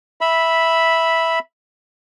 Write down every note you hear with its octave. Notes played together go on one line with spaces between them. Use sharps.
E5 B5